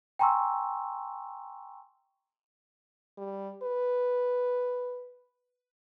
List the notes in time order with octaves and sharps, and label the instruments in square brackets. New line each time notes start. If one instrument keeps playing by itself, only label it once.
[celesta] G5 G#5 A#5 C6 C#6 E6
[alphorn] G3
B4